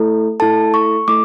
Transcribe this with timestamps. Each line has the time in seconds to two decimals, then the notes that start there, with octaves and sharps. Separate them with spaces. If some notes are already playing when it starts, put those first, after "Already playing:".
Already playing: A3 E4 A4
0.40 A3 E4 A4 A5
0.74 C#6
1.08 A3 E4 A4 D6